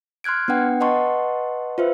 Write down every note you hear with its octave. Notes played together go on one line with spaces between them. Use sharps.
C6 F6 F#6 G#6 D7
B3 D4 B4 F#5 G5
B4 D#5 F#5 A5 C6 C#6
F4 B4 C5 E5